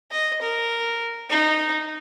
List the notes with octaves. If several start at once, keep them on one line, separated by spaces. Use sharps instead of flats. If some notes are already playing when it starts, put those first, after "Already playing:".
D#5
A#4
D#4